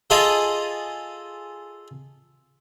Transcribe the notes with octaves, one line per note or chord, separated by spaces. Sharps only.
F4 G#4 A4 D#5 F5